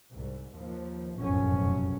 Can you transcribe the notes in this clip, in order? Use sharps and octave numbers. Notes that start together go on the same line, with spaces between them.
C2 G#2
D#2 F3
F1 B1 F#2 A2 F#3 C#4